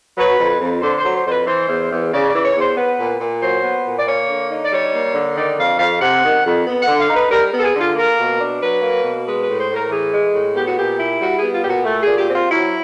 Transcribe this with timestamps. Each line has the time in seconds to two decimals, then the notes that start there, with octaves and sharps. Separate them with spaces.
0.16 F#3 B4
0.38 F2
0.59 F2
0.82 D3 C5
0.98 C5
1.04 F#3
1.14 C5
1.25 F2 C5
1.30 B4
1.46 E3 C5
1.69 E2
1.90 E2
2.12 C#3 D5
2.28 D5
2.34 E3
2.44 C#5
2.55 E2
2.60 C5
2.76 B3 B4
2.98 A#2
3.19 A#2
3.41 F#3 C5
3.63 B3
3.84 A#2
3.97 D5
4.06 A#3 C#5
4.28 D3
4.50 D#4
4.64 D5
4.71 G3 C#5
4.92 A#3
5.14 D3
5.36 D#3 D5
5.57 F2 F5
5.79 F2 F5
6.01 C3 F#5
6.23 D#3
6.45 F2
6.66 B3
6.81 F#5
6.87 D3
6.99 F5
7.09 D#4
7.14 B4
7.31 G3 A#4
7.53 B3
7.58 A4
7.63 G#4
7.74 D3
7.79 F4
7.95 A#3 A#4
8.17 B2
8.39 D4
8.60 F#3 B4
8.81 A#3
9.03 B2
9.26 G#3 B4
9.42 B4
9.47 A2
9.58 C5
9.68 A2
9.74 A#4
9.90 E3 G#4
10.12 G#3
10.33 A2
10.55 B3 G4
10.65 F#4
10.77 A#2 G4
10.98 E4
11.20 G3 F#4
11.36 G#4
11.41 B3
11.52 F4
11.62 A#2 G4
11.69 F#4
11.85 A3
12.02 A#2 G#4
12.18 G4
12.29 C4 F4
12.50 F#3 E4